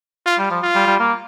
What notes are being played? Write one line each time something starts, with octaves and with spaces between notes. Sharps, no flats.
F4
G3
F3
F4
G3
G3
A#3